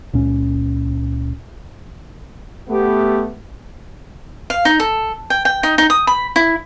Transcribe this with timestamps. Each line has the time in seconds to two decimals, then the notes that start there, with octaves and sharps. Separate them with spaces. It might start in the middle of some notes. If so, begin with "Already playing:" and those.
0.13 C#2 A#2 C#4
2.69 A3 B3 G4
4.50 F5
4.65 D#4
4.80 A4
5.30 G5
5.45 G5
5.63 D#4
5.78 D#4
5.90 D#6
6.07 B5
6.36 E4